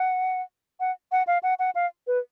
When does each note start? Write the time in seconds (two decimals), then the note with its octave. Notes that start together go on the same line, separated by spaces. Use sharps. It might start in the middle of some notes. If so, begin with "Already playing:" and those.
Already playing: F#5
0.80 F#5
1.12 F#5
1.27 F5
1.43 F#5
1.59 F#5
1.75 F5
2.07 B4